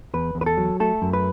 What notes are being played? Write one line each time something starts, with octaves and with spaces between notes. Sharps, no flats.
E2 B4
E2
B4
A4
F#3
A3 A4
F#2
B4